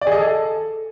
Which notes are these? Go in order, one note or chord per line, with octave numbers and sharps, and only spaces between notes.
D5
G#4
D#5
A4